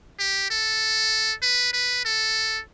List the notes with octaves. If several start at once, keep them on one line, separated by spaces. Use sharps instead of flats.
G4
A4
B4
B4
A4